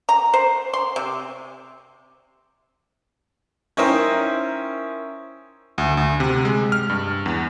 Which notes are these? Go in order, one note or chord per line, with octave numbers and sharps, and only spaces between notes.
A#5
C5
C6
C3
C#4 D#4 E4 A#4 C5 G5
D2
D2
C3
G#3
F6
G2
E2